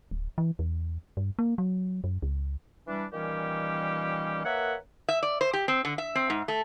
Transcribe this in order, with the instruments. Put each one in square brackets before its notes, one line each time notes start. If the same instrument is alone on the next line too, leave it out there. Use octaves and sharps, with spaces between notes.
[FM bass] D1
E3
E2
G2
A#3
F#3
F#2
C#2
[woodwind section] E3 G3 D4
A#2 D#3 E3 G3 C#4 G4
A#3 A#4 B4 C#5 E5 F#5
[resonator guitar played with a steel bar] E5
D5
C5
G4
C4
D3
E5
C4
G#2
A3